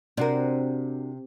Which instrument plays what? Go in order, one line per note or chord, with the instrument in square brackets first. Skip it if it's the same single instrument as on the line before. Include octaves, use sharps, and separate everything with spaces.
[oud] C3 [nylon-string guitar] D4 F#4 A#4